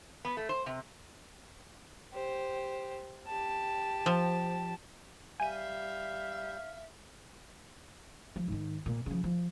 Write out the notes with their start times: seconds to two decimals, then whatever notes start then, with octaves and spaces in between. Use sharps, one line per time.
0.25 B3
0.37 A3
0.49 C5
0.66 C3
2.13 G4 C5
3.28 G4 A5
4.06 F3
5.40 G3 E5 F5 G#5 G6 D#7
8.36 F3
8.48 G#2 D#3
8.86 A#2
9.06 C#3 F3
9.24 F3